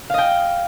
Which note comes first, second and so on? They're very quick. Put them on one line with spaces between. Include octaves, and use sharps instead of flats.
F5 D#5 G5